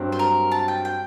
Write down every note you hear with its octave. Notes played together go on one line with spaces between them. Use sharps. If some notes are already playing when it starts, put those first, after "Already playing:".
Already playing: G2 F#3 C4
C5
A#4
A5
G5
G5